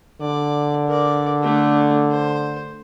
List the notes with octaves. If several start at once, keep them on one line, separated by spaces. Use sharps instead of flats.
D3 D5
A#4 D5
A3 D4
C5